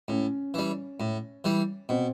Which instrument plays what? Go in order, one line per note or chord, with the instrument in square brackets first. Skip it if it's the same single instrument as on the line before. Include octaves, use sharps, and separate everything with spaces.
[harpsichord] A2 [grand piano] C#4
[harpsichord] E3 G3
A2
E3 G3
[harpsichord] B2 [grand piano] C4